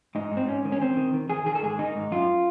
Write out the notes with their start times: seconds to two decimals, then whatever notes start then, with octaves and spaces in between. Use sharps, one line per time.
0.15 G#2 D#4
0.32 G#2
0.37 C4
0.48 G#2 C#4
0.65 D#3
0.72 C#4
0.81 D#3 C4
0.97 D#3
1.14 D#3
1.30 D#3 G#4
1.46 D#3 G#4
1.55 A4
1.62 G#2 G#4
1.79 D#3 D#4
1.95 G#2
2.12 F#2 F4